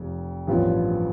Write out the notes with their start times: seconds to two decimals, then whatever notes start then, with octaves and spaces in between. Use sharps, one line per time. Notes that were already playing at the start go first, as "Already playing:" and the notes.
Already playing: F1 F2
0.47 A1 G2 F3 B3